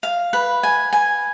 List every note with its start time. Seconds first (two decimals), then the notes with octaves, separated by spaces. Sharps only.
0.03 F5
0.33 B4
0.63 G#5
0.93 G#5